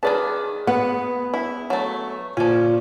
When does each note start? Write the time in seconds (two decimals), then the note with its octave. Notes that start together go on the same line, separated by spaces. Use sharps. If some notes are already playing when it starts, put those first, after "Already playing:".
0.03 D#3 G#4 B4 D5 A5
0.67 B3 F#5
1.34 E4
1.70 F#3 A3
2.37 A#2 F3 C#4